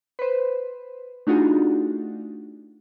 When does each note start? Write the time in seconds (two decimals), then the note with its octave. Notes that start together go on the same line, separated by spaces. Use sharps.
0.19 B4 C5
1.27 A3 D4 D#4 F4 F#4 G#4